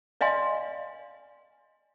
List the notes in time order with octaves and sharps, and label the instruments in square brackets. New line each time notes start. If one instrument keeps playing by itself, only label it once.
[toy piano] D5 D#5 F5 G#5 C6